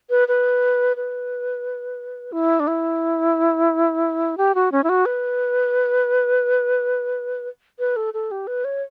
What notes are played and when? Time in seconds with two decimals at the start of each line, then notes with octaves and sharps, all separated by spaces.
0.10 B4
0.28 B4
0.97 B4
2.32 E4
2.60 D4
2.67 E4
4.38 G4
4.55 F#4
4.72 C#4
4.84 E4
4.89 F#4
5.06 B4
7.79 B4
7.96 A4
8.14 A4
8.31 G4
8.47 B4
8.65 C#5